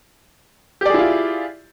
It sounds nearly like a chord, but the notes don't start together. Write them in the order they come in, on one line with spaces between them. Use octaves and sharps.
G4 D5 G#4 E4 F4